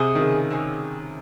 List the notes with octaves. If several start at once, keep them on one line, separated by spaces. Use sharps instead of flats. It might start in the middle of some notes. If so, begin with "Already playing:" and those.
Already playing: C3 G#4 C5 D#5 F#5
D#3
C#3
C4 D#4 G#4 C#5